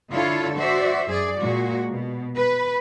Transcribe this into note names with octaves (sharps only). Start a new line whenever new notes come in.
D3 E4 F4 A4 C#5
F#4 C5 D5 E5
F#2 G#4 D5
A#2 G#3 F#4
B2
B4